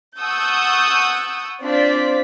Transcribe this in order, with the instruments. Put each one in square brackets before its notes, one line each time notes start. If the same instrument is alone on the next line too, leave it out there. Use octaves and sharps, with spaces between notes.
[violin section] F#5 A5 C#6 D#6 E6 G6
C4 D4 F4 C5 D5 B6